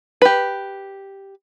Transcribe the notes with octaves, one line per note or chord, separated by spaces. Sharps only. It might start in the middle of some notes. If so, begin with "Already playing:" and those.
G4 B4